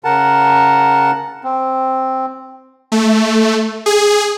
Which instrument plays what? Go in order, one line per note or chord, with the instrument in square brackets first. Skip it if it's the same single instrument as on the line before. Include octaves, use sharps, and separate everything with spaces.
[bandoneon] C#3 A#4 F#5 A5
C4
[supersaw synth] A3
G#4